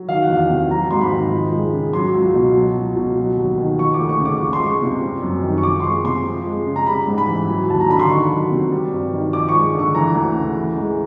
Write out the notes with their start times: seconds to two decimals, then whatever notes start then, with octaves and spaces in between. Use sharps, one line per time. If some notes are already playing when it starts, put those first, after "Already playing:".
Already playing: F#3
0.08 D#3 F5
0.22 F#5
0.30 E2
0.35 F5
0.50 C3
0.70 F#3 A#5
0.91 G#2 C6
1.01 B5
1.12 D#3
1.33 F3
1.52 G#3
1.73 C#3
1.93 F#3 C6
2.14 C#2
2.34 B2
2.55 F#3
2.75 C#2
2.96 B2
3.17 F#3
3.37 D#2
3.57 D#3
3.78 F3 C#6
3.94 D6
3.99 D2
4.09 C#6
4.20 C#3
4.25 D6
4.38 F3 C#6
4.53 C6
4.60 G#3
4.67 C#6
4.82 C3
5.01 G3
5.22 F#2
5.42 D#3
5.58 C#6
5.63 F3 D6
5.80 C6
5.83 G#3 C#6
6.04 C3 C6
6.25 F3
6.46 G#3
6.67 C#3
6.76 A#5
6.87 G3 B5
7.07 G#2
7.18 B5
7.28 E3
7.49 F#3
7.68 D#2 A5
7.80 A#5
7.89 D3 B5
8.00 C6
8.09 D#3 C#6
8.31 F#3
8.51 C3
8.71 G3
8.92 G2
9.13 D#3
9.33 F3 D6
9.49 G#3 C#6
9.75 D3 C#6
9.94 E3 A#5
10.15 D2
10.36 C#3
10.57 E3
10.77 G#3